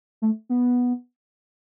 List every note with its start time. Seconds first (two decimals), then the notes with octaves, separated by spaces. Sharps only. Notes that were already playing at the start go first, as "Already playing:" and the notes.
0.22 A3
0.50 B3